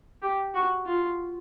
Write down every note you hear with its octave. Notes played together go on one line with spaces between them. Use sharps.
G4
F#4
F4